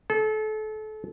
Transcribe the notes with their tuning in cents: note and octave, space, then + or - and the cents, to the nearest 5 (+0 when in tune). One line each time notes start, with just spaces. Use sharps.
A4 -30